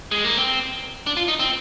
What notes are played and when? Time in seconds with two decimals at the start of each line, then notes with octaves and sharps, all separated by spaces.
0.11 G#3
0.24 A#3
0.37 C4
1.06 D4
1.17 F4
1.28 D#4
1.39 C4